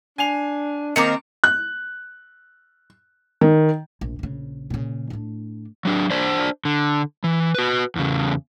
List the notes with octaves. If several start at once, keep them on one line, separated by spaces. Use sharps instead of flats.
D4 G#5 C7 F7
D#3 A#3 C4 A#4 D6 C#7
F#6
D#3
A#1
A#1 C#3
A#2 C#3
A2 D4
F#3 D4
D4 C5 D5
D3
E3
F#4 B4
E2 C#3